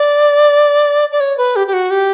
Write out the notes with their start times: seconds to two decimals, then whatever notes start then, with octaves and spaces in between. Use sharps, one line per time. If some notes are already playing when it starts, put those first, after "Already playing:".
Already playing: D5
1.12 D5
1.20 C#5
1.38 B4
1.56 G4
1.67 G4
1.73 F#4
1.91 G4